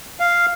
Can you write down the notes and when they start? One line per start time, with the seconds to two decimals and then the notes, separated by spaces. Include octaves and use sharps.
0.20 F5